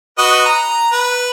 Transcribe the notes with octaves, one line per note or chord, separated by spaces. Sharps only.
F#4 B4 D#5
A#5
B4